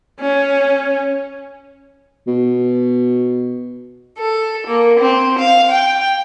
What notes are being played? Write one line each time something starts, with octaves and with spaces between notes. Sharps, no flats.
C#4
B2
A4
A#3
C4
F5
G5